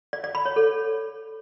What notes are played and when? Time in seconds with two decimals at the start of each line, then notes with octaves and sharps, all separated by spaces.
0.13 D5
0.24 D5
0.35 B5
0.45 C#5
0.56 A4